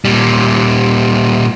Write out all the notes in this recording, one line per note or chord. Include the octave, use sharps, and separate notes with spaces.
A#2 G3